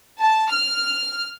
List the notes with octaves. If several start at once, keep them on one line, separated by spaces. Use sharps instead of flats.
A5
F6